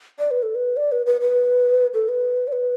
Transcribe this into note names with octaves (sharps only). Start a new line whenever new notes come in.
D5
B4
A4
B4
D5
B4
B4
B4
A4
B4
D5
B4